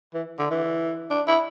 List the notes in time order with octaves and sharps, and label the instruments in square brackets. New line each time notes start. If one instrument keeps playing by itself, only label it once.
[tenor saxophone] E3
D3
E3
D4
E4